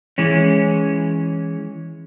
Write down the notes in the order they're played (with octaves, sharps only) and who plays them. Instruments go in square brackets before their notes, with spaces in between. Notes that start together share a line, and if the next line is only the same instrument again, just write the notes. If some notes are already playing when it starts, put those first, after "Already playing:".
[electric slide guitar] E3 G#3 C#4